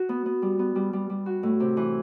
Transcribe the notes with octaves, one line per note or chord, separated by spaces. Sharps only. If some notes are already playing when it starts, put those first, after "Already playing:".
Already playing: F#4
B3
B3
G3
B3
G3
G3
G3
F#4
A2
C3
E3